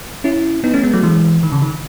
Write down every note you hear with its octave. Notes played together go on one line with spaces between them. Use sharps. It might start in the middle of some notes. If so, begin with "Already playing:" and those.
C#4 E4
B3 D#4
A3 C#4
G#3 B3
F#3 A3
E3 G#3
D#3
C#3
D#3